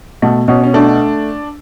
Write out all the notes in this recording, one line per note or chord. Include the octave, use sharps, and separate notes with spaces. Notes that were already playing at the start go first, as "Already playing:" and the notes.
B2 A3
B2 C#4
C#4
A3 D4